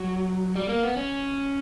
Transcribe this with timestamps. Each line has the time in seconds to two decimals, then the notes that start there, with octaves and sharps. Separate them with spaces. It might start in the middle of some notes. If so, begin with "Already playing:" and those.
Already playing: F#3
0.56 G3
0.69 A#3
0.83 B3
0.97 C#4